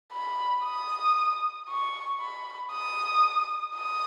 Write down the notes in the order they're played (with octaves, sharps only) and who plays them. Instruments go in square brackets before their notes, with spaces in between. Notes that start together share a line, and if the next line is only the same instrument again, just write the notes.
[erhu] B5
D#6
C#6
B5
D#6
D#6